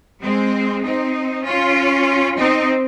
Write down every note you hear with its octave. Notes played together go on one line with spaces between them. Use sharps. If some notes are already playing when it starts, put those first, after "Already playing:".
G#3 C4
C4 D#4
C#4 F4
C4 D#4